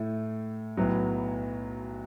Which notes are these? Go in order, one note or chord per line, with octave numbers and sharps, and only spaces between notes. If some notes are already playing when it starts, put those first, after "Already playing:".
Already playing: A2 A3
B1 A2 F#3 B3